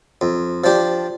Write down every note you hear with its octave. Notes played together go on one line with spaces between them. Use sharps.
F2
F3 D4 G4